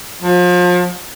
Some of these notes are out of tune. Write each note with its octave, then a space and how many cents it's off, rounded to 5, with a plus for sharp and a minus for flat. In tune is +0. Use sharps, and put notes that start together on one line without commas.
F3 +35